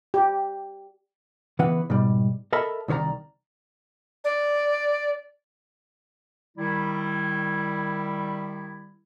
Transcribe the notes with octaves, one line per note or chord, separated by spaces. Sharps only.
G4
C#3 E3 B3 B4 F#5
G#2 B2 G3
A4 A#4 D#5 E5 A5 B5
C2 D#3 C#5 D5 A#5
D5
D#3 G3 E4